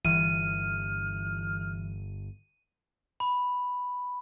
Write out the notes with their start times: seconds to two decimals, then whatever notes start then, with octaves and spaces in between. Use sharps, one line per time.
0.05 G1 E3 F6 D#7
3.20 B5